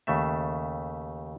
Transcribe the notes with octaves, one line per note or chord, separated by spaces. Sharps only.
D#2 C#3 A3 E5